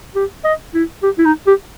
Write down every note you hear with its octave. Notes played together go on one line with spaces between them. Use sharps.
G4
D#5
E4
G4
E4
D#4
G4